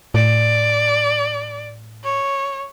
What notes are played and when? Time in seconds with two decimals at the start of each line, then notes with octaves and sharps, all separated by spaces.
0.14 A2 D5
2.04 C#5